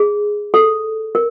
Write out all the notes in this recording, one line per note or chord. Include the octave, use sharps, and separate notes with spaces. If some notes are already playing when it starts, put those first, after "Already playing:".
Already playing: G#4
A4
A#4